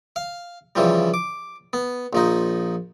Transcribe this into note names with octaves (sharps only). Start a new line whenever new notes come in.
F5
C#3 E3 F3 G3
D6
B3
A#1 F3 D#4